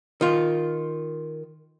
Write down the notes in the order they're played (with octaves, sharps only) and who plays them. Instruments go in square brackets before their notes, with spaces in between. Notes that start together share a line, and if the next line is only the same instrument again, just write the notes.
[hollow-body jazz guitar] D#3 F4